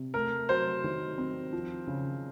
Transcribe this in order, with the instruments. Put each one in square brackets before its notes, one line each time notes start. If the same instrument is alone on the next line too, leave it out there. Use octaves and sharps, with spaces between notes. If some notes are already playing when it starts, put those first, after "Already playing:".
Already playing: [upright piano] C3
[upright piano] A3 [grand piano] A#4
[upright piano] F#3 [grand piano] C5
[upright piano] D#3
C4
F3
C#3